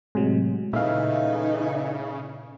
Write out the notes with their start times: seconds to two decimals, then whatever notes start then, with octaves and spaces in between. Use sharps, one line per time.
0.15 A2 C3 F#3 G#3
0.73 A#2 C#3 E3 A3 D#4 E5 F5